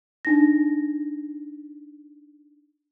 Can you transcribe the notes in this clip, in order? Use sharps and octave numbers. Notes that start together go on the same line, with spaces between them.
D4 D#4 A#6